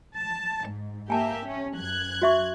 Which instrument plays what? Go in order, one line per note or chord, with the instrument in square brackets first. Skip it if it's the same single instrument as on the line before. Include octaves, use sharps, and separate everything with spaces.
[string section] A5
G#2
[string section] A#3 G4 E5 [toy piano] G#5 A5
[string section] C#4
F#2 F#6 G#6
[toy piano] F#4 E5 C#6